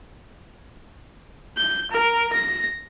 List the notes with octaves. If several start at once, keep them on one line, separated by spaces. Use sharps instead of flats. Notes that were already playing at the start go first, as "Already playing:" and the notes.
G6
A#4
A#6